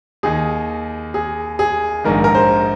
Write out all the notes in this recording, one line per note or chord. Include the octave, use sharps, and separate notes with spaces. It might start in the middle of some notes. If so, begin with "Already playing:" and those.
D#2 D#3 G#4
G#4
G#4
A#1 G#2 D#3 A#4
A#4
C5